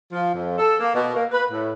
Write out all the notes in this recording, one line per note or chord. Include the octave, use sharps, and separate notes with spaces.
F3
F2
A4
A#3
B2
A#3
B4
A2